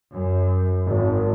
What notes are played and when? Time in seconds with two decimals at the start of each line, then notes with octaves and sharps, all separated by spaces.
0.12 F#2
0.88 G#1